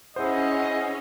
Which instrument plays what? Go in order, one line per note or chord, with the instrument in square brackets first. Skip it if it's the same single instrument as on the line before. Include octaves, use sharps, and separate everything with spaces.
[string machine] C#4 [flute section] E4 G#4 F#5 [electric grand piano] C5 [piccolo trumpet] D#5